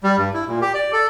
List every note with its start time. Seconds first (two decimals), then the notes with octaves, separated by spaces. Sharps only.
0.04 G3
0.17 G2
0.34 E4
0.48 A#2
0.62 G4
0.74 D5
0.93 A4